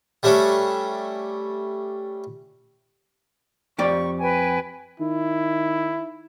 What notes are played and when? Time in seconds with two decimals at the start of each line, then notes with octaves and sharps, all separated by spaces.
0.23 G3 A3 C#4 D4
3.78 F2 G4 D5 C#6
4.20 B4 G5 G#5
5.00 D#3 E4